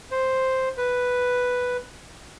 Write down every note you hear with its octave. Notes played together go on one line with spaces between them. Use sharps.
C5
B4